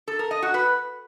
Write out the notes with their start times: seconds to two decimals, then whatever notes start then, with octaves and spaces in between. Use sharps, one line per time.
0.08 A4
0.19 A#4
0.31 D#5
0.42 F#4
0.54 B4